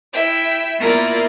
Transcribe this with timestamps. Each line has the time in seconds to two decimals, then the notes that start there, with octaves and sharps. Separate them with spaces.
0.12 E4 E5 G5
0.79 A#3 B3 E4 F4 A#4 D5